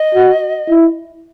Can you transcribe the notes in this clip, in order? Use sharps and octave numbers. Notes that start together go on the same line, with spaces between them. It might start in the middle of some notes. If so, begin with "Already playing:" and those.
Already playing: D#5
F#4
E4